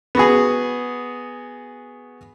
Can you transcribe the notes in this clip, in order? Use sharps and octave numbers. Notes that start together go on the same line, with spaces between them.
B3 F#4 G#4